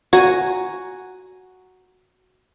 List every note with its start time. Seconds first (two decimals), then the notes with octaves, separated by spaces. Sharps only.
0.13 F#4 G#5 A#5